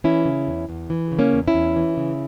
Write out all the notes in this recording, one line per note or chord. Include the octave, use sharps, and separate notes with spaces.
E3 C#4 E4
C#3
E2
E2
E3
C#3
A#3 C#4
E2
C#4 E4
E2
E3
C#3